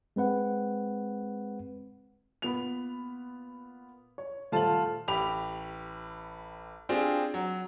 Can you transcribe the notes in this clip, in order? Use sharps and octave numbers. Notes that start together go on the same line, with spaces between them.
G#3 C4 B4 F#5
A#2 B3 B5 F7
C#5
D#1 A3 F4 C5 A5 F#7
A1 G4 B5 F7
C4 D4 F4 G4 G#4
F#3